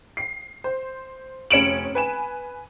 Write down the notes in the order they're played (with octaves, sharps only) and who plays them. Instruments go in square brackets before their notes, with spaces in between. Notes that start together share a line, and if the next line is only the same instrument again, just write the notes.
[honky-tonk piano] C7
C5
F1 C#4 C#7 D7 E7 F#7
B4 G#5 E7